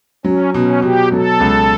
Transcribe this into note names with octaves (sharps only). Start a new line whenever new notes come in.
F#3 C#4
B2 C#4
B2 G4
F#3 A4
C#2